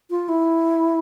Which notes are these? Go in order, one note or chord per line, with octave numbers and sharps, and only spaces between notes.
F4
E4